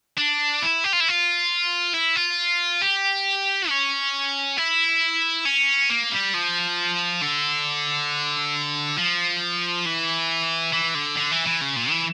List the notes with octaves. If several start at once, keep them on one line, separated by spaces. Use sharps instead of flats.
D4
E4
G4
F4
E4
F4
E4
F4
G4
C#4
E4
C#4
A#3
G3
F3
D3
F3
E3
E3
D3
D3
E3
E3
C#3
A#2
E3